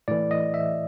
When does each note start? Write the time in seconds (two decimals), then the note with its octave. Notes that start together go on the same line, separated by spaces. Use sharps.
0.08 A2 E3 D5
0.31 D#5
0.54 E5